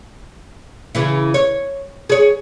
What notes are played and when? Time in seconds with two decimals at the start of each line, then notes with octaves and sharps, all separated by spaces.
0.95 C#3 E3 E4
1.34 C#5
2.09 G#4 C#5